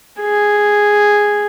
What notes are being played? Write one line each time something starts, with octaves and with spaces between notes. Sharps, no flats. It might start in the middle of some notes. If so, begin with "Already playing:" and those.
G#4